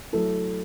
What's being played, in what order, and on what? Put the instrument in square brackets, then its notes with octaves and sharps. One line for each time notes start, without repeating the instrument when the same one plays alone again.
[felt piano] F#3 A3 E4 A4